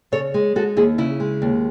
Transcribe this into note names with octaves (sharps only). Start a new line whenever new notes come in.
C#3 A4 C#5
G#3
G#3 F#4 A4
D#2 E4 G#4
C#3 E4
G#3
D#2